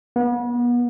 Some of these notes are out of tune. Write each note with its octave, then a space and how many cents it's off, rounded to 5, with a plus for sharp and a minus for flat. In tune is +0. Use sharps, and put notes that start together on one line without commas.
B3 -35